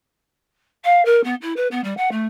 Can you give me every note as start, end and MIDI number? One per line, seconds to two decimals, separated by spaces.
0.84 1.03 77
1.05 1.23 70
1.24 1.35 59
1.41 1.53 64
1.56 1.67 71
1.71 1.80 59
1.84 1.94 55
1.97 2.09 78
2.11 2.26 57